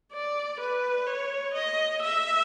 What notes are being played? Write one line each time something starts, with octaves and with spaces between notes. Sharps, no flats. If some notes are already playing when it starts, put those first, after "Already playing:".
D5
B4
C#5
D#5
E5